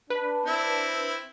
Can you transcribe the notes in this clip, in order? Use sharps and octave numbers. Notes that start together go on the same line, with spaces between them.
D4 B4
C4 E4